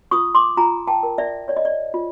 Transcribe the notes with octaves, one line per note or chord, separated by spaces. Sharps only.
F4 C#6 D#6
C6 D6
F4 G#5 A#5
G5 A5
A#4
D5 E5
C#5 D5
D#5
D5
F4